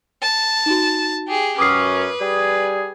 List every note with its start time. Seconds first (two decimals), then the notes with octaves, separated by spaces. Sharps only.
0.22 A5
0.66 D#4 F#4
1.28 G4 G#4
1.59 F#2 C#4 B4 D6 D#6 C7
2.20 G3 G#4